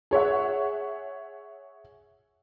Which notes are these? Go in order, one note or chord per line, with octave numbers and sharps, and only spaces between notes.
G#4 C#5 E5 F#5